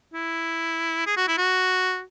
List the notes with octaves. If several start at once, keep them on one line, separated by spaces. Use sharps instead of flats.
E4
G#4
F#4
E4
F#4